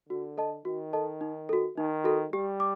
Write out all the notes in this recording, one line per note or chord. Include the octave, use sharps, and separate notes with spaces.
D3 F#4
A4 D#5 A5
D#3 F#4
A4 D#5 A5
D#4
F#4 A4
D#3 D#4
F#4 A4
G3 G4
D6